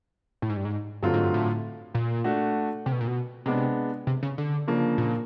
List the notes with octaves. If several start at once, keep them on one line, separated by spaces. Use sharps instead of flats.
A2
G#2
G2
G#2
G2 D3 F#3 A3 C4 F4
G#2
G2
A2
A#2
A3 D4 F#4
C3
B2
A#2
B2
C3 G#3 B3 D4
C3
C#3
D3
C#3 F3 A#3 D4
A#2